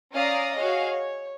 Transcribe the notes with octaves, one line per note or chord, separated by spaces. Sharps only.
C#4 D5 F5 A#5 D#6 A#6
F#4 G#4 C#5 D#5 F5
C#5